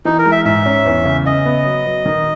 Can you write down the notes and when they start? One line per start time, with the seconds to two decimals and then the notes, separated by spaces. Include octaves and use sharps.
0.05 E3 D#4
0.19 A#4
0.25 G#3
0.32 E5
0.45 G#2 E5
0.66 C#4
0.86 E2
1.05 C#3
1.26 C#3 D#5
1.46 B3
1.65 F#3
1.86 F#3
2.06 D#3